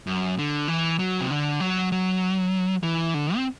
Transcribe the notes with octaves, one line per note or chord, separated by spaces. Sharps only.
F#2
D3
E3
F#3
C3
D3
F#3
F#3
E3
D3
C4